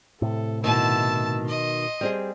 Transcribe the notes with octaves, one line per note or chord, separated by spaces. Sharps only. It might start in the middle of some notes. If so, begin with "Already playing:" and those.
A2 C3 A4
B2 D#3 E4 A5 E6
D#5 C6
G3 C4 G#4